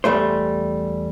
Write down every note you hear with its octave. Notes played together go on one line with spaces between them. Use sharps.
E2 G3 A3 C5